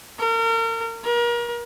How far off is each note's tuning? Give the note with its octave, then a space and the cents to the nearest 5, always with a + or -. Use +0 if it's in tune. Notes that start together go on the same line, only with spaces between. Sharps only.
A#4 -35
A#4 +35